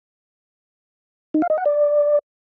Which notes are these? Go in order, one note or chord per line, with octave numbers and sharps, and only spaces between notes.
D#4
F5
D#5
F#5
D5